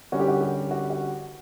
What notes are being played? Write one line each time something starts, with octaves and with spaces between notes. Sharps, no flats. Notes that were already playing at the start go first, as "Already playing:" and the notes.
D3 G3 C#4 F#4
G4
F#4
G4
F#4
F#4